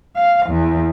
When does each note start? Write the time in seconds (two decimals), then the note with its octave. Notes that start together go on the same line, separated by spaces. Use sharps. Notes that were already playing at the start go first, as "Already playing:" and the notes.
0.16 F5
0.47 E2